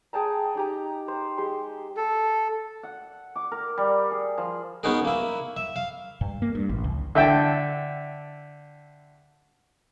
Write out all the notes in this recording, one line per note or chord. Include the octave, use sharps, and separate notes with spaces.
G#4 G5 A5 A#5
D#4 G4 A#5
C5
G#3 G4 C6
A4
F#5
D6
A#4
G3
G#4
F3
B3 C#4 D#4 F#4 G#4 A#4
A#3 E4
E5
F5
G2
A#3
G2
A1
C#2
D3 E5 G5 A5